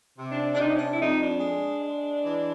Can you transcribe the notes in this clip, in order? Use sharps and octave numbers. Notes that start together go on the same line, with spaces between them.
C3
D4
D4
C3 D#4
C#4
D4
E4
F2 D#4
D4
G#3
G#3
E3